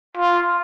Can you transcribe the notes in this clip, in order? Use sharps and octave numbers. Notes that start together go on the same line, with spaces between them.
F4